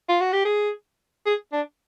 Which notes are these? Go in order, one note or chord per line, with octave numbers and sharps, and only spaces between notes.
F4
F#4
G4
G#4
G#4
D4